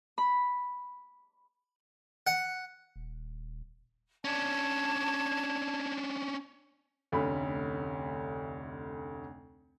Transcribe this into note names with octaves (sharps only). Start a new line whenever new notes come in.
B5
F#5
D#1
C#4 D4 A5 G#6
F1 D2 C#4 B5